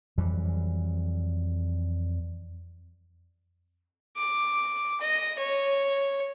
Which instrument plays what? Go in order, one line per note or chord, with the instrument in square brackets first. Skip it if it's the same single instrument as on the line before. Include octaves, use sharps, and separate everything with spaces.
[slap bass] F2 E3 F#3 G3
[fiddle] D6
D#5
C#5